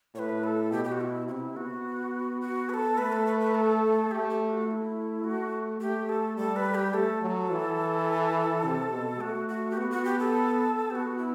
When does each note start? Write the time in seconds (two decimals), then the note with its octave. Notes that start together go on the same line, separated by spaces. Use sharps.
0.15 A2 C#5
0.19 B4
0.44 A4
0.71 B2 G4
0.84 G4
0.92 F#4
1.00 E4
1.28 C3 E4 F#4
1.56 B3 F#4
2.41 F#4
2.69 B4
2.74 A4
2.98 A3 B4
3.12 A4
3.26 B4
3.40 B4
3.55 A4
4.11 A3 G4
4.30 G4
4.49 F#4
4.67 A3 F#4
4.71 E4
5.24 A3 F#4
5.81 A3 G4
6.09 A4
6.37 G3 A4
6.56 B4
6.75 G4
6.94 A3 A4
7.22 F#3
7.51 E3
8.64 C3
8.92 B2
9.20 A3 F#4
9.48 F#4
9.71 G4
9.77 B3 F#4
9.91 F#4
10.05 G4
10.19 A4
10.90 B3 G4
10.95 F#4
11.18 E4